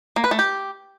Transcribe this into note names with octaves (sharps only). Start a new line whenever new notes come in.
A#3
B4
A3
G4